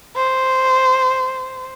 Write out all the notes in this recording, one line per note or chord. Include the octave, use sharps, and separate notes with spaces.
C5